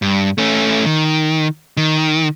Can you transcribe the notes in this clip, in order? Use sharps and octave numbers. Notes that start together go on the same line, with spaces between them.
G2
A3 C#4
D#3
D#3